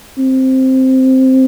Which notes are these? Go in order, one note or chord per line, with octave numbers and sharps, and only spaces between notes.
C4